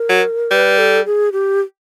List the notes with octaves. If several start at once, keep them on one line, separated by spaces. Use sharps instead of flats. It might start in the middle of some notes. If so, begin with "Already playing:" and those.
Already playing: A#4
F#3
G3 B4
A4
G#4
G4